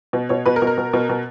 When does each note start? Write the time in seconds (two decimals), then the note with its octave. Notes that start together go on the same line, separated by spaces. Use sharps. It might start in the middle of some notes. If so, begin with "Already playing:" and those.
0.13 B2
0.29 B2 C#5
0.46 B2 B4
0.56 A#4
0.62 B2
0.67 A#4
0.78 B2
0.93 B2
1.09 B2